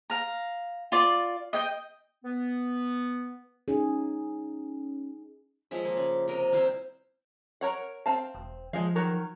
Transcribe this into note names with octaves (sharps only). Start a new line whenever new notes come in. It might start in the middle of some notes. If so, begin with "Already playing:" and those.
F5 A#5
F4 D5
D#5 G5
B3
C#4 D#4 G#4
F3 G#3 C#5 E5
A#3
C#3
C3 A#4 D#5
G3 C4 E4 C5
A#4 C#5 F#5
C4 F5 A5
E1
F3 G#3 G#4 F5
D#3 F#3 A#4